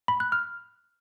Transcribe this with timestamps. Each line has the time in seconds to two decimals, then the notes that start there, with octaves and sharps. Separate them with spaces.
0.08 B5
0.20 F#6
0.32 F6